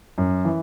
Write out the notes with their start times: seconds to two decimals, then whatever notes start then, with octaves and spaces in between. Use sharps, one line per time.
0.18 F#2
0.45 E3